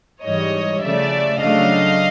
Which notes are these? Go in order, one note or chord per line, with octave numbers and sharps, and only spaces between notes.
G#2 E3 G3 C#5 D#5
C#3 F3 A3 D5 E5
C#3 F#3 A3 D4 D#5 F5